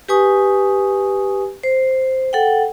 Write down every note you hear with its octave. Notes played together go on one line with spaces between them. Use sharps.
G4 B4 G#5 C#6 D#6
C5
A4 F#5 G5